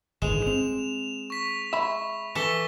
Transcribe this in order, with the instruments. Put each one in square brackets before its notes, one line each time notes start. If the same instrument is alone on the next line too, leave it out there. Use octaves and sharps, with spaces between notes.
[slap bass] G1 A2 D#3 [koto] G#3 [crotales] E7 F7
[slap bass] C4 [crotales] F7
[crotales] C#6 B6
[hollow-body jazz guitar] E5 B5
[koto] E3 A4 [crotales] C#6 B6 G7